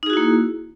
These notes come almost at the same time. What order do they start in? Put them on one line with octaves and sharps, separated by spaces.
D#4 G#4 F#4 E4 A#3